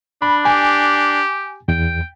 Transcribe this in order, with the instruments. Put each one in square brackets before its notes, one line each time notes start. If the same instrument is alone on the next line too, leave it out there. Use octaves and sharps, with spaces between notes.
[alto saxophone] D4 [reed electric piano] B5
[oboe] G4 [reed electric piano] G#5
[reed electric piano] E2 [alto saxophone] G5